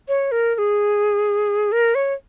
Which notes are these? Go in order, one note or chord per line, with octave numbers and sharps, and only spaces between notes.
C#5
A#4
A#4
G#4
A#4
C#5